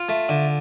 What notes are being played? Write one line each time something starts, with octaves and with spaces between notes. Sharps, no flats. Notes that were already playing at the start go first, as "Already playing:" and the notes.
Already playing: F4
A3
D3